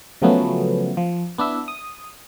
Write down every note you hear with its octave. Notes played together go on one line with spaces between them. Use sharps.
C#3 F3 F#3 A3 B3 C#4
F3
B3 D4 E4 E5
D#6